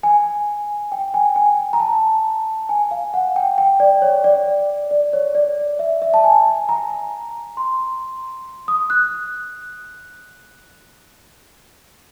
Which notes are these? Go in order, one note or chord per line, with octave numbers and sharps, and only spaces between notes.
G#5
G5
G#5
G#5
A#5
A5
G#5
F5
F#5
G5
G5
D5
C#5
D5
D5
C#5
D5
E5
E5
A5
G#5
A#5
C6
D#6
F#6